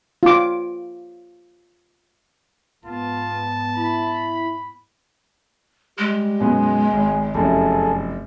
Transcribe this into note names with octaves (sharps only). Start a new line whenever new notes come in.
F4 D6
G#2 B3 F4 A5
E4 B5
G3 G#3
F#2 B2 B3 G#4
G#1
F1 F#2 E4 G#4 A4